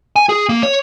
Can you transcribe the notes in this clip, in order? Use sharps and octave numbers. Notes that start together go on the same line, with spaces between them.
G#5
G#4
A#3
C#5